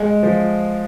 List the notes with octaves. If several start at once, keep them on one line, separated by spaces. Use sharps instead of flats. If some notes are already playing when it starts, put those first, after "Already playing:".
Already playing: G#3
F3